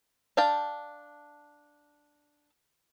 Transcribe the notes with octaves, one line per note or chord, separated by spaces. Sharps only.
D4 F5 G5 A5